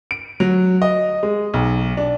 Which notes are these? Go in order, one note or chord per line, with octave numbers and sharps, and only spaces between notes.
D7
F#3
D#5
G#3
B1
D4